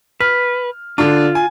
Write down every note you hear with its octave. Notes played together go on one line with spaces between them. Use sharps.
B4 F6
D3 D4 F4
G#5